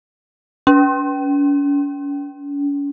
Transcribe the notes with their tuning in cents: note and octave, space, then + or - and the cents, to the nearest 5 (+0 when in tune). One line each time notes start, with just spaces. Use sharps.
C#4 +45